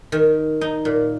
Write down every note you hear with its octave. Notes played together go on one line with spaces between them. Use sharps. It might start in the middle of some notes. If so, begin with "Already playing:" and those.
D#3
D#4
A#2